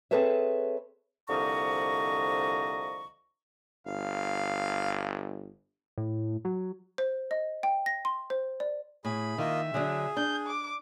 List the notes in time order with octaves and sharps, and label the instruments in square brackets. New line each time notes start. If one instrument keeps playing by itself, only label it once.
[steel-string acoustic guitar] C4 G#4 A4 B4 C#5 E5
[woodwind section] C2 D3 F3 D#5 A#5 C#6
[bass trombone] G1 [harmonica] F5
[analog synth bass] A2
F#3
[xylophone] C5
D#5
G5
A#6
C6
C5
D5
[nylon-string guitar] A2 [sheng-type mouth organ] G#4 B5
[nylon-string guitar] D#3 [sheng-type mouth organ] A#3 F4 D#5 [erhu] E5
[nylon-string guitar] D3 F#3 D4 [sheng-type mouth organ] G#4
[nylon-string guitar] D4 [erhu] G6
[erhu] D6